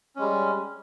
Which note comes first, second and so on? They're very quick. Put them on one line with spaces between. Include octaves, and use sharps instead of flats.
C#4 G#3 G3